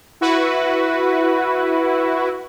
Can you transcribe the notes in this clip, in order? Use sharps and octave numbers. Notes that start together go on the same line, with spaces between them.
E4 F#4 B4